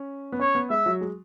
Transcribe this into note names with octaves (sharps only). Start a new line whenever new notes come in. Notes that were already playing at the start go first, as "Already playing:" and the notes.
Already playing: C#4
B3
C#4 C#5
B3
G#3 E5
F#3
G#3